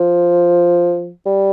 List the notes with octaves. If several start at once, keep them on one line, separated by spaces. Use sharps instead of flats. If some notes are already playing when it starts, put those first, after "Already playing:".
Already playing: F3
G3